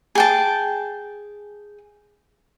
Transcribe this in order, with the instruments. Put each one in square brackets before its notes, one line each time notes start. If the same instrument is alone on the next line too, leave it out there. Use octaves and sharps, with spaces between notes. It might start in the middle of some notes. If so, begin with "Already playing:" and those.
[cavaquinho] G#4 G5 A5